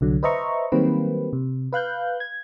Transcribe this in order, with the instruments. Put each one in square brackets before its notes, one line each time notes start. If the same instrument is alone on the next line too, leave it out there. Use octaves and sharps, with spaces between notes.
[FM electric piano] C2 D3 F#3
B4 C5 D#5 E5 A#5 C#6
D#3 F#3 G3 A#3 C4 B4
C3
B4 F5 F#6 G6
G#6